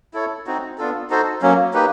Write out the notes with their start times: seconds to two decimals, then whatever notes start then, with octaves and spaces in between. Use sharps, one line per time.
0.14 E4 A4 C#5
0.47 C4 D#4 F#4
0.78 B3 D4 F4 A4
1.10 D#4 F#4 A4 C5
1.42 F#3 A#3 C#4
1.74 A#3 D#4 G4 B4